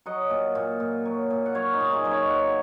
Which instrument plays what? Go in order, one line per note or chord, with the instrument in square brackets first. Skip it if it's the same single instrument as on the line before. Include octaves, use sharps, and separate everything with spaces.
[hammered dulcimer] F#3 D#5 F#5
A#2
A#2
A#2
F#3
A#2
F#5
F#3 C#5 F5
D#4 F#4
A#2
F4 G#4
F#3 D#5
C#5 F5
F#3 F#5